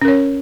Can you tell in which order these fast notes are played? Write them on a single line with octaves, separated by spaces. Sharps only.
C#4 A#4 C#5